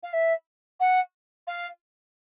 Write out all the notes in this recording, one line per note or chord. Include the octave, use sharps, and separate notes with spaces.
F5
E5
F#5
F5